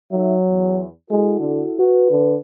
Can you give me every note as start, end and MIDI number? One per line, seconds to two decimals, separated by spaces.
0.12 0.83 54
0.12 0.33 63
0.12 0.33 69
0.12 0.33 76
0.47 0.86 40
1.10 1.38 56
1.10 1.75 64
1.10 1.75 66
1.10 1.75 69
1.40 1.64 50
1.79 2.09 66
1.79 2.36 71
2.10 2.36 50